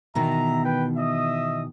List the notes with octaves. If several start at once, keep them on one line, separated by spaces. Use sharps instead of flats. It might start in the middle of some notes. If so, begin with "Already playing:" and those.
B2 D#3 E3 E5 A#5
B4 G5
D#5 E5 D#6